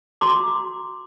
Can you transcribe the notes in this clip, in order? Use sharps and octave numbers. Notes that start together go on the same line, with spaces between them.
F#4 A#5 C6 D6